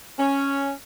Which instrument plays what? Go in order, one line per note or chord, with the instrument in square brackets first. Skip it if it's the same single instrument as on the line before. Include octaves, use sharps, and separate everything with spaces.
[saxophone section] C#4